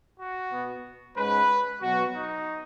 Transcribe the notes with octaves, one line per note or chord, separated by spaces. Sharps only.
F#4
B2 B3
G#2 G#3 C#4 B4
B2 F#3 B3 F#4
D#4